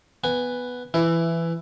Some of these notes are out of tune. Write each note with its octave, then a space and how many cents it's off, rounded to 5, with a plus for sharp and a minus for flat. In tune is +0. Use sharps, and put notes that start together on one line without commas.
B3 +0 G#5 -15
E3 +15 E4 +10